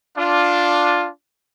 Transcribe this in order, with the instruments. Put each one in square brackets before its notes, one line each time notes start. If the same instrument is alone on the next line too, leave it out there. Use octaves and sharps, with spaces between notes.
[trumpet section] D4 F4